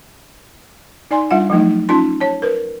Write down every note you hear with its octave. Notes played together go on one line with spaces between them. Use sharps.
D#4 D5 G#5 C6
G3 D4 F4 E5 F#5
F3 F#3 A3 D#4
C#4 D#4 F4 A5 C6
C#5 A5
A#4 B4